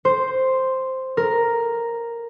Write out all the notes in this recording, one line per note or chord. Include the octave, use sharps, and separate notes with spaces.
C5
A#4